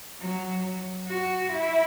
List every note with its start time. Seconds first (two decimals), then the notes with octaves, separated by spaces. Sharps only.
0.20 F#3
1.09 F#4
1.53 E4